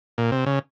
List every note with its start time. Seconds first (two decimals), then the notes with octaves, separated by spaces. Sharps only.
0.18 A#2
0.32 C3
0.46 C#3